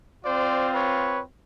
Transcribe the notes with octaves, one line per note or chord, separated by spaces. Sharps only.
C4 F4 C5 D5
B4 C#5